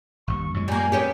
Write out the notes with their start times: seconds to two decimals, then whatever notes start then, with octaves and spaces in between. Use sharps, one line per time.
0.27 G1 D#2 C#6
0.54 F#2 A#2 G#3 C#6
0.68 G3 A#3 G#5
0.92 B3 C#4 G4